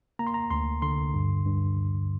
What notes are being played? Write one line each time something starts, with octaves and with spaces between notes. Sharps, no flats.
A#3 A#5
C6
A#5
D2 C6
D3 C6
G2
G2